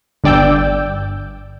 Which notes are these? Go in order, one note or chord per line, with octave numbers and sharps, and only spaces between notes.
G1 G2 D5 G5 E6 G6